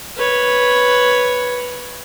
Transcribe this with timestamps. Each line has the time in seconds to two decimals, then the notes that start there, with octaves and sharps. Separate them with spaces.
0.16 B4 C#5